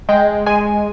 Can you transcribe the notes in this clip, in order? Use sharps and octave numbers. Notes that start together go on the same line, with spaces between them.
G#3 G5
G#3 G#5